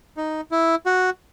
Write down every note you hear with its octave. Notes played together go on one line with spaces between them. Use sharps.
D#4
E4
F#4